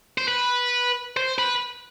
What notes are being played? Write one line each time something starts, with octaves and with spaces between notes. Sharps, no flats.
C5
B4
C5
B4